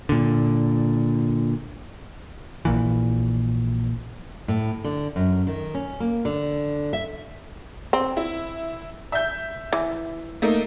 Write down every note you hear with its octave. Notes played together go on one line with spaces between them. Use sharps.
A#2 D3
A#1 A#2 E3
A2
D3
F#2
D#3
C#4
A#3
D3
E5
C4
E4
E5 G6
E3
A3 A#3 D#4